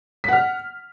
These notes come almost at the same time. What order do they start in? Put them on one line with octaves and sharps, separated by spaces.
B6 F#5 F6